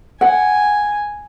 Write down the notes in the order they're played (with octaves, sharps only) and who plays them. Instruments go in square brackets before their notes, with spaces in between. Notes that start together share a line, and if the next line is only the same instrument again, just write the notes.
[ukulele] F#5 [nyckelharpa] G#5